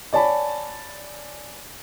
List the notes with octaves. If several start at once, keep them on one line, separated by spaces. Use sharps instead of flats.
C#5 D5 G#5 A5 B5